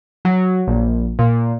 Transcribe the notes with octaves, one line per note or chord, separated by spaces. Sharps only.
F#3
A#1
A#2